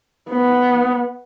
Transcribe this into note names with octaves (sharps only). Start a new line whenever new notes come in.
B3